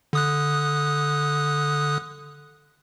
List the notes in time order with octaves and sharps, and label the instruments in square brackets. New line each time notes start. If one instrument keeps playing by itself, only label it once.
[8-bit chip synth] D3 D#6 F#6